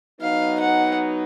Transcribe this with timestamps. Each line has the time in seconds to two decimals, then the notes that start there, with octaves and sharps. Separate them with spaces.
0.21 F#3 B3 D#4 F5
0.60 F#5